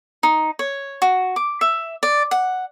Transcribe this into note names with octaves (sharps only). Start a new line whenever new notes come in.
D#4
C#5
F#4
D6
E5
D5
F#5